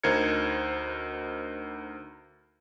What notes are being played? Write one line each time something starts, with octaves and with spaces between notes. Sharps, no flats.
D2 D#4 A#4 C5 G#6 C#7